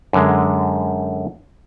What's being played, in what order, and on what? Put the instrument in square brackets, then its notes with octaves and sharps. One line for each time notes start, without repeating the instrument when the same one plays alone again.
[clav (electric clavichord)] F#2 D3 G#3